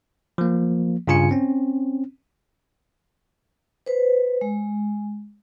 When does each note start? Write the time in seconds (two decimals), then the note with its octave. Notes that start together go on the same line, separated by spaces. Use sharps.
0.38 F3 A#3
1.07 G2 C#3 F4 G#5 C#7
1.31 C4 C#4
3.86 B4 C5
4.41 G#3